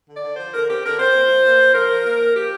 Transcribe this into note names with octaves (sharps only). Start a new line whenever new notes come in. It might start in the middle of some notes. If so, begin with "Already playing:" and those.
D3
D5
D3
F3 C5
D3 A#4
C4 G4
D3 A#4
C4 C5
A#2
F3
A#3
F3
F3 A#4
F3
A#3
A#2
F3 G4